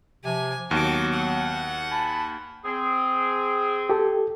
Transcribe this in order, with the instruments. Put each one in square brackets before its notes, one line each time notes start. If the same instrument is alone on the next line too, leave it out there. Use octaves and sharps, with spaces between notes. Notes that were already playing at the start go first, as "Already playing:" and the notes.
[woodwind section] C3 F3 [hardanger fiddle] G#5
[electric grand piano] D#2 [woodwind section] F#3 B3 [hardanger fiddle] F#4 D6
[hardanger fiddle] F#5
[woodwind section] G#5 A5 B5
[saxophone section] C4 G#4
[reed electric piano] G4 A4